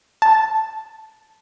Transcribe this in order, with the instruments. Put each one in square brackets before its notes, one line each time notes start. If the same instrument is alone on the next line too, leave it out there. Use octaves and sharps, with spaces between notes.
[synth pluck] A5